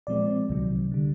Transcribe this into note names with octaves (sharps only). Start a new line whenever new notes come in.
A#2 F3 G#3 C4 D5
C2 C3 D#3 F#3
D3 G3